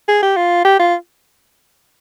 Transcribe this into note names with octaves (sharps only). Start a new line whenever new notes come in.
G#4
G4
F4
G4
F4